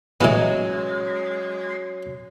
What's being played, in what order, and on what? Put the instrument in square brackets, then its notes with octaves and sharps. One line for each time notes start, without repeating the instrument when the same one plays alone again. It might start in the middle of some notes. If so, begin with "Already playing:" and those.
[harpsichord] A2 E3 B3 [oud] F#3 C#4 [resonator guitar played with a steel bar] G#3